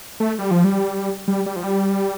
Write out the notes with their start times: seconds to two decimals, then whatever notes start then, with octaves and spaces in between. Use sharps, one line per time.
0.20 A3
0.39 G3
0.51 F3
0.64 G3
1.28 G3
1.46 G3
1.56 F3
1.64 G3